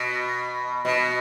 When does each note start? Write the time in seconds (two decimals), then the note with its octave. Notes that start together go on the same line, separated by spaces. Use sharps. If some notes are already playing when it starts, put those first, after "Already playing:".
Already playing: B2
0.85 B2